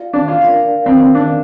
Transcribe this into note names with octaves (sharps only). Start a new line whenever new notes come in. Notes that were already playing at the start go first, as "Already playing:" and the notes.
Already playing: F4 D5 F5
D4
F4
D4 A#4 D5 F5
C4
C4
D4